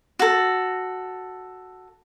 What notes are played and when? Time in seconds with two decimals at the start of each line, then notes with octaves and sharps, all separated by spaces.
0.19 F#4 A4